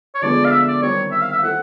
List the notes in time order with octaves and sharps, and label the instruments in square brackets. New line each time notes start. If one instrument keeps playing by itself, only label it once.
[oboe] C#5
[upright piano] D3 F3 G#3 B3 D4 [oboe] D5
[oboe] F5
E5
D5
[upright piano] D#3 G3 C4 [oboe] C#5
[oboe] E5
F5
E5
[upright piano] C4 E4 A4 [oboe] F#5